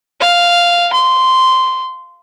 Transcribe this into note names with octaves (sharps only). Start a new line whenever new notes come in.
F5
C6